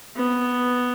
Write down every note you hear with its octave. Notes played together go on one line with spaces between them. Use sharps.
B3